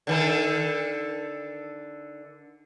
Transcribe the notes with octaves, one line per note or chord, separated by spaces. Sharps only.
D3 D#3 A4